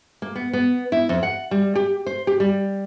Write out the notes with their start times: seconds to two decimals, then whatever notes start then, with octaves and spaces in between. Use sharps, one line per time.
0.22 A#3
0.36 B3
0.53 B3
0.92 E4
1.09 F2
1.23 F#5
1.51 G3
1.75 G4
2.06 C5
2.27 G4
2.40 G3